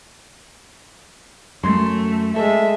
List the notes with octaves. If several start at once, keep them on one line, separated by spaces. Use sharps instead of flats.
F#2 A3 C6
G#3 A4 E5